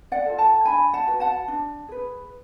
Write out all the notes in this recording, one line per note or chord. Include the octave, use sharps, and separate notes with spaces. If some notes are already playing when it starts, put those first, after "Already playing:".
D5 F#5
F4 A4
F#5 A5
D4 G#5 B5
F#5 A5
F#4 B4
F#5 A5
D4
G#4 B4